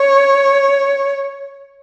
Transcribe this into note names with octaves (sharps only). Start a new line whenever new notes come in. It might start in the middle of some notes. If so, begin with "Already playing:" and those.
Already playing: C#5